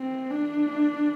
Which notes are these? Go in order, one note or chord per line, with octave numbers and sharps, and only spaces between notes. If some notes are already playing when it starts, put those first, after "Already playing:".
Already playing: C4
D4